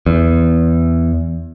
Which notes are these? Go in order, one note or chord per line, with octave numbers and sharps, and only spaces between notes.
E2